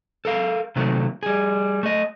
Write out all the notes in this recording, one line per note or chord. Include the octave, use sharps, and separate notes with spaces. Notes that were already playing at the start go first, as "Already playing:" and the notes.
A4 A#4 F5
C3 D#3 F#3 A3 A#3
G3 G#4
A3 D#5